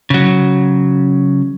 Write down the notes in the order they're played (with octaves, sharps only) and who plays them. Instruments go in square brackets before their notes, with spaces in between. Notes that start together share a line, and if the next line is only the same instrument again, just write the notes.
[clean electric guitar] C#3 F#3